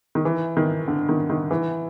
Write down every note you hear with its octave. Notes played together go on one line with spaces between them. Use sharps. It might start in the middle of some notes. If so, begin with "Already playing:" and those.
D#3
E3
D#3
D3
D#3
D#3
E3